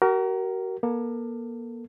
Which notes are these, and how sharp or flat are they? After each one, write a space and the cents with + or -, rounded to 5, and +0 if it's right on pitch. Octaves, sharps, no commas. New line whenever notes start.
F#4 +40 A#4 +0
A#3 +35 A4 +25